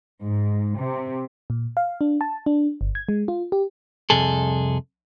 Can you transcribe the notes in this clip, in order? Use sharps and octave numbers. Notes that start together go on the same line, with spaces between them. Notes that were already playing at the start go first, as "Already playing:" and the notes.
G#2
C3
A#2
F5
D4
A5
D4
G1
G#6
G#3
F4
G4
C2 F2 C3 G#4 A4